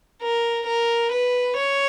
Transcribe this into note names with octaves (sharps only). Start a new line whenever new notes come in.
A#4
A#4
B4
C#5